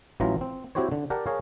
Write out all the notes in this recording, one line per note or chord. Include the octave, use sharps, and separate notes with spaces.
A1 E3 F#3 F4 A#5
C4
C4 E4 F#4 G4 C5 C#5
D3
G4 A#4 D5 F#5 A5
G#4 A#4 C#5 F5